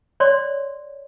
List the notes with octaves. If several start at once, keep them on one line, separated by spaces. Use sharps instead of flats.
C#5 D5 C6